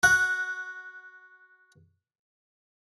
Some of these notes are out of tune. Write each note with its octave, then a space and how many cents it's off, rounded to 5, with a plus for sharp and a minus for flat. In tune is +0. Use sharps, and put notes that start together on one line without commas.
F#4 +0 F#5 -10